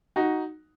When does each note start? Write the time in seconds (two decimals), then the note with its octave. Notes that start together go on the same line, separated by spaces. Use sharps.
0.16 D#4 F#4